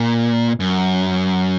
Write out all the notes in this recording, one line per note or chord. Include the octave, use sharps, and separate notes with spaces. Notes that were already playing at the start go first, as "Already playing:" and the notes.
Already playing: A#2
F#2